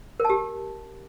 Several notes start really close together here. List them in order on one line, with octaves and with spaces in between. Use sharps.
A#4 A5 G4